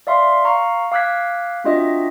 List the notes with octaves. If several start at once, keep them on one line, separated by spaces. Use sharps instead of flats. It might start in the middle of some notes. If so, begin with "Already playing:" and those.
D5 E5 F5 C6
F5 A#5 C#6
F5 D6 E6 F#6 G#6 B6
C4 D4 F4 F#4 D#5 E5